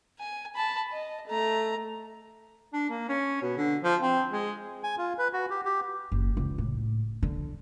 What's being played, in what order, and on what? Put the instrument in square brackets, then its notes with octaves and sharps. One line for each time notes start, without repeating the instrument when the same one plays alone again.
[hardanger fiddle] G#5
A5 B5
D#5
A3 A#5
[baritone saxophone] D4
A#3
C#4
B2
D3
F3
C4
G#3
[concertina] G#5
F4
B4
F#4
G4
G4
[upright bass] F#1
C#2
A2
D3